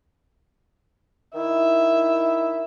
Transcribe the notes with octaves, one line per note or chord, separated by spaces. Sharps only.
D#3 E4 E5